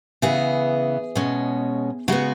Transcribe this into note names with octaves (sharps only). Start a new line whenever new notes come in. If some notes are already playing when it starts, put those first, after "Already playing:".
C#3 E3 B3 G#4
B2 G#3 C#4
C#3 G#3 B3 F#4